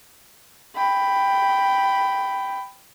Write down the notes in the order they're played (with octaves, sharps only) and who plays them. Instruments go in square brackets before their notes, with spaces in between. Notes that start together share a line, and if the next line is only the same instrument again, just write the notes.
[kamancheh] G5 B5